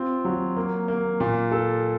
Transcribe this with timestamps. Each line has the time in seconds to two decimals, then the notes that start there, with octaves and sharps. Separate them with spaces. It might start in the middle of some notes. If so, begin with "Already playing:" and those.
Already playing: C4 F4
0.25 F#3
0.57 A#3
0.88 A#3
1.20 A#2
1.52 A4